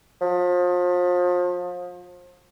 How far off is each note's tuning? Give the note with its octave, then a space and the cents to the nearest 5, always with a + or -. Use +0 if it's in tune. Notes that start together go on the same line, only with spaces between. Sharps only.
F3 +35